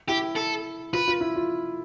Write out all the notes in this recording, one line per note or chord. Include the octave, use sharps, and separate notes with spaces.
E4 G4
A4
F4 B4
F4
E4
F4